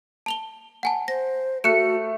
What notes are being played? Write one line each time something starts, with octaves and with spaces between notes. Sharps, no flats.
A5 F7 G7
F#5 G#5 A5
C5 A#6
A3 F#4 F#6 C#7 E7